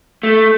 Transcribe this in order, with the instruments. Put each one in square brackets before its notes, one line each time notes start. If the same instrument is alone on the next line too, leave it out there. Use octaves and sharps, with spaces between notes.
[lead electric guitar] A3